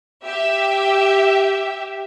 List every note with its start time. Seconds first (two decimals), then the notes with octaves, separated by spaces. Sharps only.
0.24 G4 E5